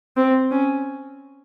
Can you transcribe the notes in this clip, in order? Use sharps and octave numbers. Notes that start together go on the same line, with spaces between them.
C4
C#4